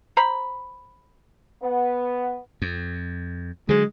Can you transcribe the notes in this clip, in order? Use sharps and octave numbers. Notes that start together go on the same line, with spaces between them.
C5 A#5 B5
B3
F2
D3 F#3 G#3